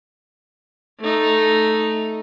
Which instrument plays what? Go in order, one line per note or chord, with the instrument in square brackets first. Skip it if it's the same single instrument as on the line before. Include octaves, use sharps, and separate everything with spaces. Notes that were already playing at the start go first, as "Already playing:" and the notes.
[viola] A3 D#4